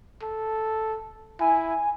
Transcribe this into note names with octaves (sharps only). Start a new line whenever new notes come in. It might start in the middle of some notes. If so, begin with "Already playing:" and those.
A4
E4 G#5